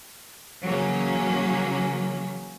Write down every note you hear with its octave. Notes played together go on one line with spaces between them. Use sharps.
C#3 E3 F#3 A#3 C#4